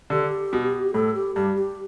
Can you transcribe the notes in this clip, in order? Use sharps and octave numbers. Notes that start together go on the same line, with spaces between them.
D3 G4
B2
A2 A4
G4
G2 G4
G4